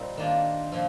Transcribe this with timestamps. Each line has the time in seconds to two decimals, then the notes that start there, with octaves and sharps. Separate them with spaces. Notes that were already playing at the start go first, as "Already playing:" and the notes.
Already playing: A#2 G3 C4 D#4
0.17 D#3 A#3 D4 F4
0.72 A#2 F3